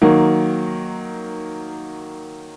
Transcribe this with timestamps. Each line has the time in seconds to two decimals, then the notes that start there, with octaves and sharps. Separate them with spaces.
0.02 D#3 F#3 A#3